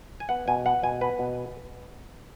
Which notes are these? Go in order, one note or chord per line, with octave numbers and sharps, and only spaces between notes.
G#5
B3 F#5
B2 G#5
B3 F#5
B2 G#5
B3 B4
B2